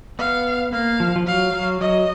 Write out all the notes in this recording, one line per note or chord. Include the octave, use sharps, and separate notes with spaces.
B3 F5
A#3 F5
F3
F3
F#3 F5
F#3
F#3 D#5